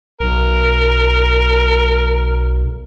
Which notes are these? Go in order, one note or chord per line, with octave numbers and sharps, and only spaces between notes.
B1 A#4